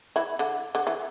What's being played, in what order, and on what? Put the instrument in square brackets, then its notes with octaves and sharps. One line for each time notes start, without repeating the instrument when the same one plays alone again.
[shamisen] E3 E4
D3
D3
E3